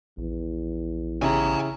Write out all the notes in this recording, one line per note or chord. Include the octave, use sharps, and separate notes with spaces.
A#1 E2
C#3 E4 G4 G#5 A#5